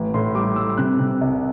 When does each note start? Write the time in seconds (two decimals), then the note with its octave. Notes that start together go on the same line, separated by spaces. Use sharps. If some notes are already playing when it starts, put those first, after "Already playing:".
Already playing: A1
0.14 A2 C6
0.34 G3 D6
0.56 G3 E6
0.77 C3 F#6
0.99 C3
1.21 C2